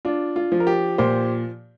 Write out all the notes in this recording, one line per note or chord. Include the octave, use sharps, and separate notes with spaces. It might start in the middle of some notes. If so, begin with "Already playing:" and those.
D4 F4
F4
F3
A#4
G4
A#2 G4 C5